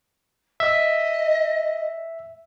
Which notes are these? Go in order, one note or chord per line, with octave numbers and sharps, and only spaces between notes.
D#5 E5